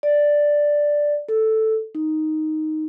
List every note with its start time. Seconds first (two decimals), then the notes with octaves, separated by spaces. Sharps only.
0.03 D5
1.29 A4
1.95 D#4